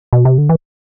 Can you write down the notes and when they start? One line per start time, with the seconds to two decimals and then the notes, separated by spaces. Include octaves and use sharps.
0.13 B2
0.25 C3
0.38 D3
0.49 E3